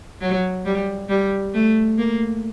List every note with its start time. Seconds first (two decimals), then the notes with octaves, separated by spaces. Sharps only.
0.21 F#3
0.65 G3
1.09 G3
1.54 A3
1.98 A#3